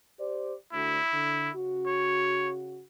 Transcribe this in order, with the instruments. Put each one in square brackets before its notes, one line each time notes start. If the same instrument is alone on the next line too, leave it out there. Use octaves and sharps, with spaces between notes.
[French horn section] G4 C5 D5
[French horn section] D2 [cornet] E4
[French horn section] D3
C#3 F#4
[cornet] C#5